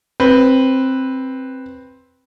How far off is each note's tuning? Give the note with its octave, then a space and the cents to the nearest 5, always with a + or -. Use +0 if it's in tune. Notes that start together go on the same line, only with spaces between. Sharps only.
C4 +10 B4 +0